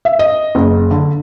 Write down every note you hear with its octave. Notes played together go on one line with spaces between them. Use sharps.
E5
D#5
F#1
D3